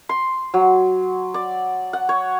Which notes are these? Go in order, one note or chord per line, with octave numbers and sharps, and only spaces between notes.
C6
F#3
D5
F#5
C#5